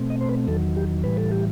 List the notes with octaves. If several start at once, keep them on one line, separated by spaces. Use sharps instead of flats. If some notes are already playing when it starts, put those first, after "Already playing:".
Already playing: B2 A3 C4
D#5
C5
B4
E2 D#3 F#3 A4
G4
A2 E3 G3 B4
A4
G4